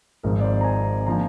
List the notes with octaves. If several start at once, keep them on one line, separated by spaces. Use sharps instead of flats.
G#1 G#2 F3 C4 A#4
D5
C5
A#5
G#5
D3 F3 A#3 A#5